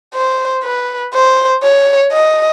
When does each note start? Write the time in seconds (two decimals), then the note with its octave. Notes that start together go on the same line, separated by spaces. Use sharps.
0.15 C5
0.64 B4
1.14 C5
1.63 C#5
2.13 D#5